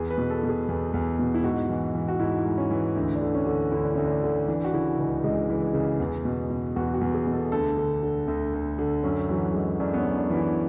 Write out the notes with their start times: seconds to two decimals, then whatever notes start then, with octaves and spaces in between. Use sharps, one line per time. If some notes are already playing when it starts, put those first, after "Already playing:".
Already playing: E2 G#4
0.10 B4
0.18 B2
0.30 A4
0.43 B2
0.49 G#4
0.69 E2
0.94 E2
1.19 B2
1.34 E4
1.44 G#2 F#4
1.69 E3
1.94 E3
2.08 F#4
2.20 G#2 E4
2.45 G#2
2.58 C#4
2.71 E3
2.96 D2
3.15 D4
3.21 D3
3.34 C#4
3.46 D3
3.71 D2 E4
3.83 D4
3.94 D2 C#4
4.06 D4
4.23 D3
4.48 E3 D4
4.64 F#4
4.73 C#3 E4
4.99 C#2
5.24 C#2 G#3
5.49 E3
5.74 C#3
6.00 E2
6.25 B2
6.50 B2
6.76 E2 F#4
6.94 F#4
7.01 E2
7.14 G#4
7.27 B2
7.33 A4
7.52 D2 A4
7.77 D3
8.02 D3
8.28 D2
8.54 D2
8.79 D3
9.03 F#2 C#4
9.29 E3 F#3
9.54 E3 G#3
9.80 F#2 D4
9.94 B3
9.98 C#4
10.05 F#2
10.18 D4
10.30 E3
10.37 E4